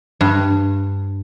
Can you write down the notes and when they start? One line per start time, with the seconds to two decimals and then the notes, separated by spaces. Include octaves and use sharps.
0.21 G2